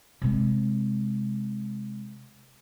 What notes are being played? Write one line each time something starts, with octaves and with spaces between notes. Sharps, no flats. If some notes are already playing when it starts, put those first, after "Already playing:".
C3 G#3